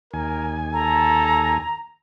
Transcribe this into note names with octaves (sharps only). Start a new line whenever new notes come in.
D#2 A#4 G#5
A4 A#5